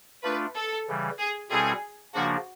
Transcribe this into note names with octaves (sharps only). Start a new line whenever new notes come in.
A3 D4 F4 B4
A4
C#3 E3 G3
G#4
B2 G3 C4 E4 G#4 A4
C#3 F3 A#3 D4 F#4